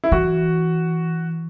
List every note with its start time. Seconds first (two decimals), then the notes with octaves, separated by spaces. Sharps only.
0.04 E4
0.12 E3 F#4